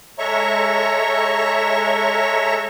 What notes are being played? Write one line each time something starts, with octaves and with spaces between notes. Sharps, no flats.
G#3 A4 C#5 E5 A#5 C#6